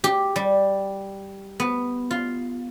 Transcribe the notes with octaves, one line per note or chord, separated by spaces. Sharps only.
G4
G3
B3
F4